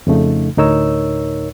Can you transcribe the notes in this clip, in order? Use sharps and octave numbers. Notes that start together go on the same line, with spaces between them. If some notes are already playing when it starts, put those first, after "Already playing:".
F2 C#3 A3 D#4
D2 A2 D#4 A#4 C#5 E6